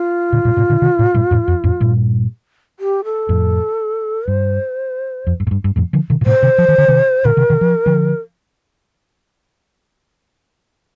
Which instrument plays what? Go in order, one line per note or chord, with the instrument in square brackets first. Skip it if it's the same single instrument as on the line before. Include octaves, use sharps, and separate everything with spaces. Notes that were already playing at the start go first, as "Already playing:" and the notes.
Already playing: [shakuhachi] F4
[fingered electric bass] A#2 D3
G2 A#2
A2 C3
A#2 D3
C3 D#3
A2 C3
G2 A#2
F2 A2
F2
F2 A2
G2 A#2
[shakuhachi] G4
A4
[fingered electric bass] F2 A2
[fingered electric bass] G2 [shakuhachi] C5
[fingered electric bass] F2
G2
A2
G2
G2
F2 A2
D3 F3
C3 D#3
A#2
[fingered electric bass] A2 C3 [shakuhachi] C5
[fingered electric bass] C3 D#3
F3
D#3
D3
C3 D#3
[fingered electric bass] A#2 D3 [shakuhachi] A#4
[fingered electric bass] C3 D#3
C3 D#3
F3
D3 F3